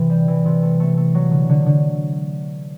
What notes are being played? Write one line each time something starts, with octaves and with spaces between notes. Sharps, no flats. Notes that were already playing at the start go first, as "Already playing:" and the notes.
Already playing: C3 E3
G3
E3
C3
A3
A3
A3
F#3
D3
D3
D3